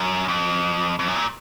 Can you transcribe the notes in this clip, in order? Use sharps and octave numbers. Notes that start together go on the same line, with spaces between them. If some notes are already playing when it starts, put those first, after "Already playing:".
Already playing: F#2
F2
F2
F#2
A#2